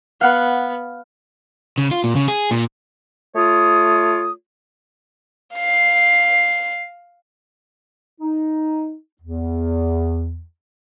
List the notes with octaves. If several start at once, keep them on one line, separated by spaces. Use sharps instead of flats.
B3 F5 F#5
C#3
F4
A#2
C#3
G#4
A#2
A3 F4 C#5 D#6
F5 C7
D#4
E2